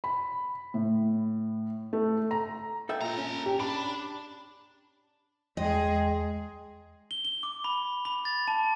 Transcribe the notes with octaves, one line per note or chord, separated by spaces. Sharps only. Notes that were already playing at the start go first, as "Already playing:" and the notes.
B5
A2
A3
A#5
A4 E5 G5
A#2 A4 A#5
C#4
G4
D4 B5
E2 G#3 G#4 D#5 G5 C6
G7
G7
D6
B5
B5
A6
A5